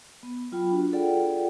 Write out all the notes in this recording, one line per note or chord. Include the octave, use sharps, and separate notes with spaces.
B3
F#3 F4 G5 B5
D4 F#4
F4 G#4 A4 D5 F#5 G5